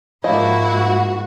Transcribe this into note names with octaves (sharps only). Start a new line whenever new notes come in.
G#2 F3 A#3 E4 F#4 D#5